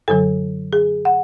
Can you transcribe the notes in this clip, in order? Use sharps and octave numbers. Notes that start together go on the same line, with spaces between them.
F#2 D3 F#3 A4
G#4
F#5